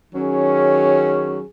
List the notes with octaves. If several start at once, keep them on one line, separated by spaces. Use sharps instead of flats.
D#3 F#3 C#4 G#4